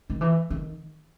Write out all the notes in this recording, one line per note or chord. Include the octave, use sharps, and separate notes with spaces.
D#3
E3
D#3